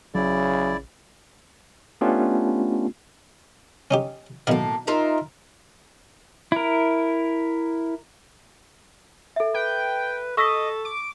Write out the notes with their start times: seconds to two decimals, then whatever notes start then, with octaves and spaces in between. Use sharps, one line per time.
0.15 A1 C#3 F#3 E4 D5
2.01 A3 B3 C#4 D4 F4 G4
3.91 C#4 D#4 G4
4.47 B1 A2 D#3 A#3 F5
4.87 D#4 F4 A#4 E5
6.52 E4 A#4
9.36 A4 E5
9.54 B4 G5
10.37 A4 D#5 C#6 E6 B6
10.85 D6